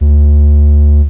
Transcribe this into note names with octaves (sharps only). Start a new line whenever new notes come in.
D2